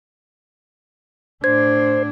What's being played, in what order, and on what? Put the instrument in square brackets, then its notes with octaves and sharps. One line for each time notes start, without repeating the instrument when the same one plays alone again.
[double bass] A2 D4 [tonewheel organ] C5 [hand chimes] G#6